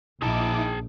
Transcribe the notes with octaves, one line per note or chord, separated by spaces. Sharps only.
A#1 D#4 E4 G#4 A5 D6